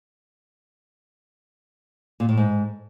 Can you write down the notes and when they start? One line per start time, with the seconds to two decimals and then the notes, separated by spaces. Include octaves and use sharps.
2.20 A#2
2.29 A2
2.37 G#2